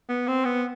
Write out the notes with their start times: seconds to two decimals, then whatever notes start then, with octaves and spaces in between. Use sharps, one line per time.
0.09 B3
0.28 C4
0.45 B3